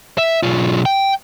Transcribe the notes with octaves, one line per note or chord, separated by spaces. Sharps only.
E5
B1 F4
G5